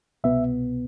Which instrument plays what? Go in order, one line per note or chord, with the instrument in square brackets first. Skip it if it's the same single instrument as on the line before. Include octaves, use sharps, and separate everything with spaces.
[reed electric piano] C2 B2 B3 E5